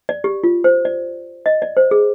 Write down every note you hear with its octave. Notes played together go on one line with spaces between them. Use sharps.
D5
G4
F4
C5
D5
D#5
D5
C5
G#4